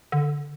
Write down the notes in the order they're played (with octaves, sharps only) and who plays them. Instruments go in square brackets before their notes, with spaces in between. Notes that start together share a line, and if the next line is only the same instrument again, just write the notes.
[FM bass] D3